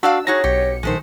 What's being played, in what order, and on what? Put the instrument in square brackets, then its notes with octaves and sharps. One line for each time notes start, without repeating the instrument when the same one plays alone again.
[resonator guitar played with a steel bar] D4 D5 F5 [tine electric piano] F#4 [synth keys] E6
[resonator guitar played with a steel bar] D#4 F#4 G#4 [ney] C#5 [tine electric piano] A#6
[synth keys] B1 C#7 [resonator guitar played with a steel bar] G4
[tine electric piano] A#1 D#3 [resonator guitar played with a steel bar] G#3 A3 C5